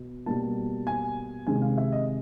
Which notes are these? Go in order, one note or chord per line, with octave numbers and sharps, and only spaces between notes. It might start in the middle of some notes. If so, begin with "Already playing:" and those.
Already playing: B2
B2 G3 A#3 A5
G#5
C3 D#3 G#3 G#5
F5
E5
D#5